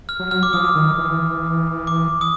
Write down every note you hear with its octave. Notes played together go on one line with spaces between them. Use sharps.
F6
F#3
F6
D6
F3 D#6
D#3
E3
D6
D#6